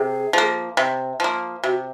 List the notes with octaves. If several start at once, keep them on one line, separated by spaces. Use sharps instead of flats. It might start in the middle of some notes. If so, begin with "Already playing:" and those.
Already playing: C3 G#4
F3 A#3
C3
F3 A#3
C3 F#4